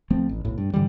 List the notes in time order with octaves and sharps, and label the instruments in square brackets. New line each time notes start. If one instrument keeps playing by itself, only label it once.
[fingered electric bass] C#2 F3 A3 C4
A1
B1 A2
G2
G#2 D3 E3 G3